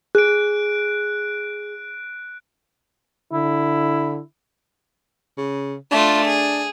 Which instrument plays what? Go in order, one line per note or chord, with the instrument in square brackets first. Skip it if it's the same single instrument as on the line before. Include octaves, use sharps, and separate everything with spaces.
[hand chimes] G#4 [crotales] F#6 D7
[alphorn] D3 [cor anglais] E4
[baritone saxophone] C#3
[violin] A3 F4 [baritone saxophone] D4
[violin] G#4